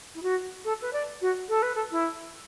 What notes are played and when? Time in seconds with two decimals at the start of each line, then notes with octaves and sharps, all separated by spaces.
0.15 E4
0.22 F#4
0.64 A4
0.81 B4
0.93 D5
1.21 F#4
1.49 A4
1.62 B4
1.75 A4
1.91 E4